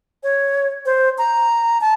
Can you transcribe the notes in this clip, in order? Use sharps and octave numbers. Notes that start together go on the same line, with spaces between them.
C#5
C5
A#5
A5